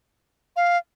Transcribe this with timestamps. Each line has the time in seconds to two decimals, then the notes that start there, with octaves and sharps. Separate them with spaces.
0.56 F5